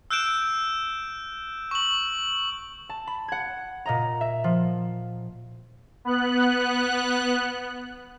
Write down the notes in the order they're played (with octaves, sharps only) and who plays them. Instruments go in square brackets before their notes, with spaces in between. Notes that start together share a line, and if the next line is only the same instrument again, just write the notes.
[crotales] E6 F#6 G6 D7 E7
C#6 F#7
[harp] A5
B5
F#5 G#6
A#2 D#5 A#5
E5
F3
[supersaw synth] B3 F#6